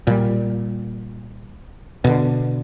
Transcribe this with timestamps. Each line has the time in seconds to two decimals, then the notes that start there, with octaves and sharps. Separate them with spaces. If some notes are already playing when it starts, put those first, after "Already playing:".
0.07 A#2 G3
2.05 B2 D3